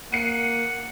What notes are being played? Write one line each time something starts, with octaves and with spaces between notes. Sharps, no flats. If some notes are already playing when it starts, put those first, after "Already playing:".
A#3 F#5 C7 C#7 D#7